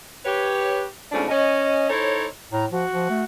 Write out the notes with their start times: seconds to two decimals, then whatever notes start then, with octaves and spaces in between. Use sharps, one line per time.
0.25 G4 B4 C#5
1.12 G#2 B2 F3 A3 C#4 D4
1.29 C#4 D#5
1.89 D#4 E4 A4 C5 C#5
2.52 A2 A#5
2.71 F3 F#4
2.92 F3
3.10 A3